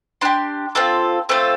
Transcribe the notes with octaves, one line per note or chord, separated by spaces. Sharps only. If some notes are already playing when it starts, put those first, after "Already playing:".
D4 G4 C6
C4 F4 A4
A3 C4 F4 A4